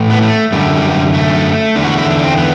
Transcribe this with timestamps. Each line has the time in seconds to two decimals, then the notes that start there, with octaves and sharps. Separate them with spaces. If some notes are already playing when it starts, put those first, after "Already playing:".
Already playing: A2 E3
0.10 B3
0.22 A3
0.52 F#2 D3 G3
0.76 G3
1.14 A3
1.75 E2 D3
1.85 F#4
1.98 E4
2.10 D4
2.24 C4
2.37 B3